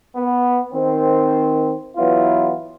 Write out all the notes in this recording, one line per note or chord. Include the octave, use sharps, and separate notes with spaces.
B3
D#3 C4
E3 F#3 B3 E4 F4